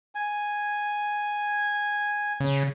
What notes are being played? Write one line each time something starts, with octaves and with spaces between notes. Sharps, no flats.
G#5
C#3